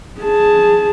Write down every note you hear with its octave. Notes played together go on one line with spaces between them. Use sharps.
G#4 A5